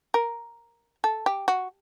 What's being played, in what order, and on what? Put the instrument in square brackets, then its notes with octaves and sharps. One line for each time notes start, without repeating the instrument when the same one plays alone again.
[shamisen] A#4
A4
G4
F#4